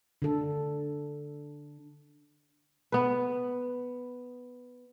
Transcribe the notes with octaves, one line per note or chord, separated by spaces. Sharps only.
D3 A4
B3 B4